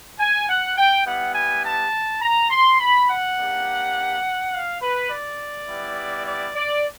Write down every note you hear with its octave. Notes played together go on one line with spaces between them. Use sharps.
G#5
F#5
G5
G3 B3 E4 G4 F#5
G#5
A5
A#5
C6
B5
F#5
A#3 D4 G4
F5
B4
D5
G3 B3 E4
D5
D5